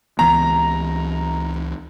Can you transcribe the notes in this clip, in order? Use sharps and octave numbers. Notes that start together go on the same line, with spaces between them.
C#2 E3 B3 A#5